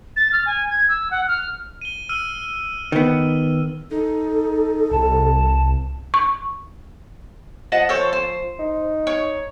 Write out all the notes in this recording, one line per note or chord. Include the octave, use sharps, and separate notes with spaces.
A6
F6
G#5
G#6
E6
F#5
F6
D#7 G7
E6 F6 D#7
D#3 B3
D#4 A4
C2 A5
C#6
F3 D#5 F#5 A5
A4 C5 C#5
C5
D#4
C#5